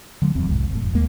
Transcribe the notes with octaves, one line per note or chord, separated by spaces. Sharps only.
D3 F#3 A3
D#1 E2 G2 C4
C2 F2 G#2
F#1 A2
G1 F2
D#2 G3 G#3 A#3